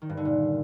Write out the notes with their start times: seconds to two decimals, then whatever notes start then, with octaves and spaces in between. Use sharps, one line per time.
0.02 D#3
0.09 G2
0.17 D3
0.25 A#2